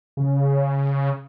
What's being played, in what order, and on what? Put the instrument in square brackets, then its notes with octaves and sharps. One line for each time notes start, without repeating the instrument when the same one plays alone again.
[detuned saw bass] C#3